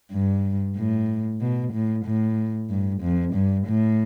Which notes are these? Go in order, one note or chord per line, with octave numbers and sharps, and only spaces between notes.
G2
A2
B2
A2
A2
G2
F2
G2
A2